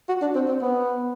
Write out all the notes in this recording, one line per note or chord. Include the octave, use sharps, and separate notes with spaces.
F#4
D4
C4
C4
B3